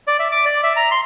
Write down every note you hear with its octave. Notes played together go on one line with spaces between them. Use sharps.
D5
E5
D6
D5
E5
A#5
C6